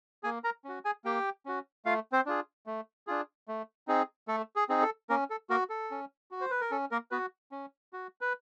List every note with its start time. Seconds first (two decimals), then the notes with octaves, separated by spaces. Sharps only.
0.23 A#3 G#4 G#5
0.44 A#4 A#5
0.64 C#4 F#4
0.85 G#4 G#5
1.05 A#3 G4 G5
1.46 C#4 F#4
1.85 A3 F4 F5
2.12 C4 C5
2.26 D4 F4 G#4
2.66 A3
3.07 D4 F4 G#4
3.48 A3
3.88 C4 D#4 G#4
4.28 A3 A4
4.56 G#4
4.69 C4 D#4 G#4
4.82 A4
5.10 A#3 C#4 A#4
5.30 A4
5.50 A#3 F#4 A#4
5.70 A4
5.91 C#4
6.31 F#4
6.41 C5
6.51 B4
6.61 A#4
6.71 C#4 A4
6.91 A#3 A#4
7.11 B3 F#4 B4
7.52 C#4
7.93 F#4
8.21 B4